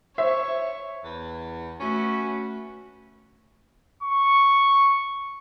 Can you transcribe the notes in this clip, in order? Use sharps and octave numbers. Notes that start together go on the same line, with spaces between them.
C5 C#5 E5
E2
A3 C#4 F#4 B4
C#6